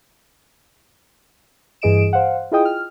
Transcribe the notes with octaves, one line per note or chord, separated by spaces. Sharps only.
G2 E3 G#4 D#5 D7 E7
C5 F5 F#5
E4 F4 G#4 D#5 G5 D#6
F6